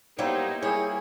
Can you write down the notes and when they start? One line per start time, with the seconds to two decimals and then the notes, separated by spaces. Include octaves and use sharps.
0.19 F#3 G3 A#3 B3 D#4 E4 G4 C5
0.62 G3 E4 G#4 C#5